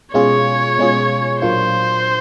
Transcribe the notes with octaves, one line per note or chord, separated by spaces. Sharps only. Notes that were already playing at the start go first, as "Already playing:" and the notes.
B2 G#3 C#4 F4 G#4 C#5
B2 G#3 C#4 F4 G#4
A#2 F#3 A#3 D4 F4 C5